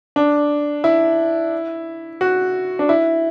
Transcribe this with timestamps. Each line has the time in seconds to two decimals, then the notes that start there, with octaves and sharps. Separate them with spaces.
0.16 D4
0.84 E4
2.21 F#4
2.79 D4
2.89 E4